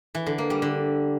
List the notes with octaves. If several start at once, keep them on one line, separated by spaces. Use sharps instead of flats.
E3
D3
A#3
G3
D3